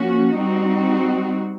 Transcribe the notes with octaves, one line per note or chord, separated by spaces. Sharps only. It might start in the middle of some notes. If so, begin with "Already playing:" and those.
Already playing: F3 A#3 C#4 F#4
G3 C4 D#4 F#4